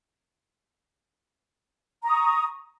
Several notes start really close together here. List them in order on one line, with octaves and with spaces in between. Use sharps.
A#5 D#6 C#6